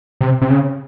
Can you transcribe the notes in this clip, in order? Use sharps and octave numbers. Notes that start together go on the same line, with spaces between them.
C3
C3
C#3